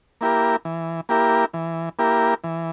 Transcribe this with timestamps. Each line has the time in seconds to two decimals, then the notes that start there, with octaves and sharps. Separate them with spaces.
0.21 A#3 E4 G4 A#4
0.65 E3
1.09 A#3 E4 G4 A#4
1.54 E3
1.99 A#3 E4 G4 A#4
2.44 E3